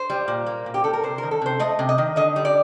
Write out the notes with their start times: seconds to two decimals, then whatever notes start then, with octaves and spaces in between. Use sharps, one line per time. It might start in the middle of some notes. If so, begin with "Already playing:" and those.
Already playing: C5
0.10 G3
0.28 A#2
0.46 A#3
0.66 A#2
0.74 G4
0.84 G3 A4
0.93 A#4
1.04 C3 C5
1.18 D#3 A#4
1.31 A4
1.42 C3 C5
1.59 A3 D#5
1.79 C3
1.89 D#5
1.98 D#3
2.16 D3 D#5
2.36 G3
2.45 D5